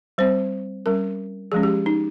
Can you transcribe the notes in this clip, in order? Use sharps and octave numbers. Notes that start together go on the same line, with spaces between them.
G3 C4 C5
G3 C#4 A#4
F3 G#3 C#4 G#4
G4
D#4